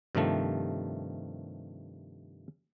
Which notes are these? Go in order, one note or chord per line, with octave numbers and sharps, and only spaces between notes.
G2 C3 D#3 F3 A3